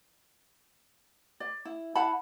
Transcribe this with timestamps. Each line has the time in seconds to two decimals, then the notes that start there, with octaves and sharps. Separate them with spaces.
1.40 D5
1.65 E4
1.95 E4 F#5 A5 B5